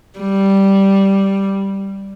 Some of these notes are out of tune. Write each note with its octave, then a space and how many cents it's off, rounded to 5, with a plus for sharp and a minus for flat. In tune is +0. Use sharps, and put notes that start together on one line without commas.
G3 -5